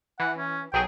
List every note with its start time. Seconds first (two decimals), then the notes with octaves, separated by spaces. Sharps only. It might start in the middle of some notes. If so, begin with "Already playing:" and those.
0.20 E3 F#5
0.38 C#4
0.73 B1 F#3 G#4 G5